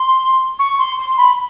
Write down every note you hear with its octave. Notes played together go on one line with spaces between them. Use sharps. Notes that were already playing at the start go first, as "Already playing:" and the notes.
Already playing: C6
C#6
C6
C6
B5